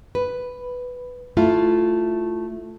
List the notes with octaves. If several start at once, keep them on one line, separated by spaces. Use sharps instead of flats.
B4
A3 E4 F4